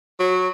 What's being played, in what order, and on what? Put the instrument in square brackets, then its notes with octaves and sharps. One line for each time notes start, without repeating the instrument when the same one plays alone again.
[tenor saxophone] F#3